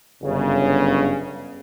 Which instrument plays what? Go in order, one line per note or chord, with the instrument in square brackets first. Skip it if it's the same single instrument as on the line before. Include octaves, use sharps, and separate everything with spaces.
[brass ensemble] G1 F#2 C#3